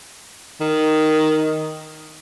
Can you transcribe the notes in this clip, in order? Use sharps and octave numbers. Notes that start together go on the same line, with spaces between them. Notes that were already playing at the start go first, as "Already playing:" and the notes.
D#3